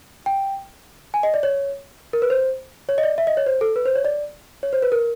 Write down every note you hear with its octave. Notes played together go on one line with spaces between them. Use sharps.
G5
G#5
D#5
D5
C#5
A#4
B4
C5
C#5
D#5
D5
E5
D#5
C#5
C5
A4
B4
C5
C#5
D5
C#5
C5
B4
A#4